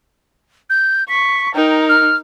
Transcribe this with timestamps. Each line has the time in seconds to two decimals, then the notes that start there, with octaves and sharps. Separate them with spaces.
0.70 G6
1.09 C#6 B6
1.55 D#4 A#4 G5
1.89 F6